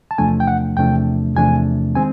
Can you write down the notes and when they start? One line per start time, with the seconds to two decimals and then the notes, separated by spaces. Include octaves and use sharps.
0.11 A5
0.18 E2 C3 F3 A3 D4 G#5
0.40 G5
0.47 F#5
0.77 E2 C3 F3 A3 D4 G5
1.36 E2 C3 F3 A3 D4 G#5
1.95 D#3 G#3 C4 G#5